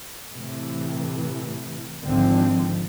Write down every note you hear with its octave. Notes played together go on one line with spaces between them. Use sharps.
A2 C3 E3
G#1 D3 F3 C4